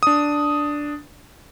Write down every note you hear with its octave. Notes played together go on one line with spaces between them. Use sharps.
D4 D#6